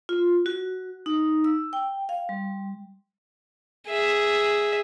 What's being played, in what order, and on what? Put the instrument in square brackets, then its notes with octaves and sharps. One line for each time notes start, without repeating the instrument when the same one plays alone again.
[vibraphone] F4
F#4
D#4
E6
G5
F5
G3
[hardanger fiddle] G#4 E5